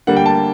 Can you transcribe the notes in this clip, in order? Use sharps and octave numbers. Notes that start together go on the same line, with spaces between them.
D3 G3 A#3 F#5
G5
A5